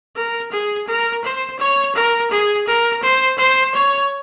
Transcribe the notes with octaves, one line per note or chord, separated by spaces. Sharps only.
A#4
G#4
A#4
C5
C#5
A#4
G#4
A#4
C5
C5
C#5